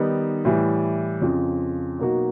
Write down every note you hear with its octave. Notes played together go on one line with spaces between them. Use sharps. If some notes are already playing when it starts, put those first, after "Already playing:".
Already playing: D#3 G3 B3 D#4
A2 E3 G3
F2 C#3 F3
B2 F#3 A#3 D#4 F#4